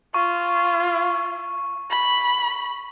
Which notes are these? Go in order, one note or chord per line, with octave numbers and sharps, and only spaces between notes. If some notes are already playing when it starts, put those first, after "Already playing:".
F4 C#6
B5